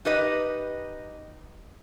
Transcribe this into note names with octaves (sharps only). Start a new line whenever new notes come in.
D#4 G4 B4 D#5